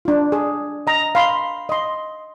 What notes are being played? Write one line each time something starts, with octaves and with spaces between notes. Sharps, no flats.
D4 F4
G#4
D#5 A#5
F5 B5 C6
D#5 C6